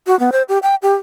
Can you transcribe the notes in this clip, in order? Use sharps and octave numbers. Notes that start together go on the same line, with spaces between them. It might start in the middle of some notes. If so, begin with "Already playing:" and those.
F#4
B3
C5
G4
G5
G4